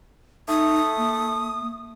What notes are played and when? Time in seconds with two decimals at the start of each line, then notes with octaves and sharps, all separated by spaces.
0.48 A3 D#4 D#6
0.97 A#3